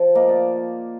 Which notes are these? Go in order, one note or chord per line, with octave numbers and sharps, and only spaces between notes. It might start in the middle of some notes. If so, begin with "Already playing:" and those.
Already playing: F3
A#3 D#5
D5